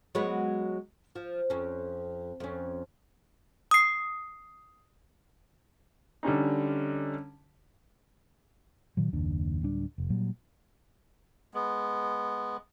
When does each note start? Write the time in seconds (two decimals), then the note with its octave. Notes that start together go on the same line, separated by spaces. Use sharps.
0.15 F#3 G#3 B3
1.15 F3
1.50 F2 C#4
2.40 F2 C#4
3.71 D#6 C7
6.23 D3 G3 C#4 D#4
8.97 A#2 D#3 F#3
9.13 F#1 D#2 D4
9.62 D1 G3 D4
9.98 F1
10.10 A#2 F#3 G3
11.54 G#3 B3